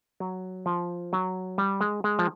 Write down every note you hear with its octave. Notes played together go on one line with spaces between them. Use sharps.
F#3
F3
F#3
G3
G#3
G#3
F3